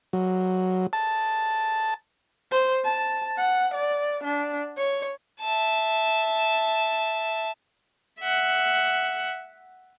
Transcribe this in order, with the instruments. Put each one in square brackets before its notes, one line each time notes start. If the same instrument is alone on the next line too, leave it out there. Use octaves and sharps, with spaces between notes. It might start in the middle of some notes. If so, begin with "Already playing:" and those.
[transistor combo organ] F#3
A5
[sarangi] C5
A5
F#5
D5
D4
C#5
[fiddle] E5 A5
[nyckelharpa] E5 F#5